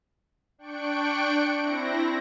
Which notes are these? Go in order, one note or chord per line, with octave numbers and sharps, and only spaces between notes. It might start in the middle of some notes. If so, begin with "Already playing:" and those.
D4 G5 C#6 F#6 C#7 D7
C4 E4 A#6